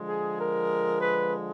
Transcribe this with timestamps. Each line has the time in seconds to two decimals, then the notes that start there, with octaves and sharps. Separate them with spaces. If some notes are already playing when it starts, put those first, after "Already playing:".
Already playing: D3 F3 G#3
0.08 G#4
0.39 A#4
1.01 B4